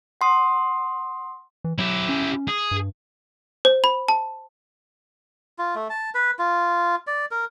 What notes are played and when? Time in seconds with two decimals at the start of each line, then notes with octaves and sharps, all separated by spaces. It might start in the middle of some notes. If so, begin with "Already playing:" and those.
0.21 F#5 C6 D#6
1.64 E3
1.78 F#3 E4 G4
2.09 C#4
2.48 G#4
2.71 G2
3.65 C5
3.84 B5
4.08 A5
5.59 F4
5.75 A3
5.90 A5
6.15 B4
6.39 F4
7.07 D5
7.31 A#4